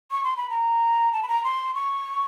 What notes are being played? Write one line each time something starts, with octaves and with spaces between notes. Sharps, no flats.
C#6
C6
B5
A#5
A5
B5
A#5
C6
C#6